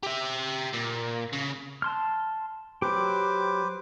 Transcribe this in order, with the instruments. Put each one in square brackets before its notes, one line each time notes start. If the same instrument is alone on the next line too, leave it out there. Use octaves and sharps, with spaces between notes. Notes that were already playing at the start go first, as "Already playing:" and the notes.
[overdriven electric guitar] G4 E5
A#2
C#3
[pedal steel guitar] A5 C6 F6
[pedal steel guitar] F#3 G4 [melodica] B4 C5 D6